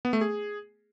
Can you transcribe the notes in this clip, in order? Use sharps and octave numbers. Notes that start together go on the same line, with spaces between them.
B3
A3
G#4